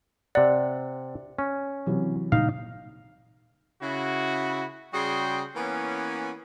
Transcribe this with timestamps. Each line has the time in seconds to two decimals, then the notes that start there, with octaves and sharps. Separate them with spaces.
0.35 C3 D5 F#5
1.39 C#4
1.86 C3 E3 F#3
2.32 A#2 C#3 G3 D#4 F5
3.82 C#3 E4 F#4
4.94 C#3 G3 F#4 G#4 G5 C6
5.56 E3 A#3 B3 C#4